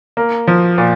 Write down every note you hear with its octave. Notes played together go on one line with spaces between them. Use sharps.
A#3
F3
A#2